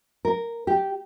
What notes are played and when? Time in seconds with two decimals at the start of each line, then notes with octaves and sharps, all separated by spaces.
0.25 A#4
0.67 G4